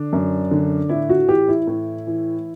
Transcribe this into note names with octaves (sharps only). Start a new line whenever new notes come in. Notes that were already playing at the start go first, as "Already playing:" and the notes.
Already playing: D3 D4
F#2
D3
A2 E4
F#4
E3 G4
E4
A2
E3